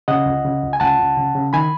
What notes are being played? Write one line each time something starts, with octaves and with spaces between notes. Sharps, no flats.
C#3 D#5 F#5
C#2
C#3
C#2
G#5
C#2 F#5 A5
C#2
C#3
C#3
D#3 G#5 B5